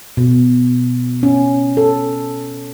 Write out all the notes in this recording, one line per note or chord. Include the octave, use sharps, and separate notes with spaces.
B2
C#4
A4